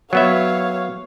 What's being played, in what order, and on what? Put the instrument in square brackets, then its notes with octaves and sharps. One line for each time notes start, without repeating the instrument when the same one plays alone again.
[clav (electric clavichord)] F#3 B3 E5 [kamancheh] C#5 F5